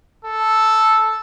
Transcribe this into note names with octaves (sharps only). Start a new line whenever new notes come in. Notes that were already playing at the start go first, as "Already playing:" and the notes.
A4